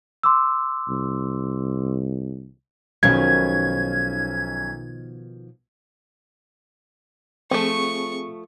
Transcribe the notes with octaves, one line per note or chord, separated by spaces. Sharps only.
C6 D6 E6
C2
B1 B2 D#3 F3 C#4 G#6
F3 A3 C4 G#4 C#6